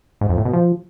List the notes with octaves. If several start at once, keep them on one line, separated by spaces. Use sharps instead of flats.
G#2
F2
A2
B2
F3